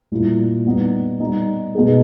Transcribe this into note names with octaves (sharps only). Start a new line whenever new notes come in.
A#2 G3 A#3 E4
G3 B3 D#4
G3 B3 D#4
B2 G#3 B3 D#4 G#4